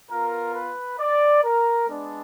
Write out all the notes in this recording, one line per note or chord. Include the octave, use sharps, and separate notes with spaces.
B3 F4 A#4
B4
D5
A#4
G#3 B3 D4